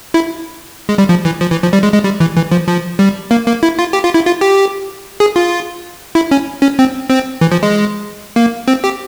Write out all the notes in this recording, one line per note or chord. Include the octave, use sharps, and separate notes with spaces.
E4
G#3
G3
F3
E3
F3
E3
F3
G3
G#3
G#3
G3
E3
E3
F3
F3
G3
A#3
A#3
E4
F4
G4
F4
E4
F4
G4
G#4
F4
E4
C#4
C#4
C4
C4
E3
F3
G#3
A#3
C4
G4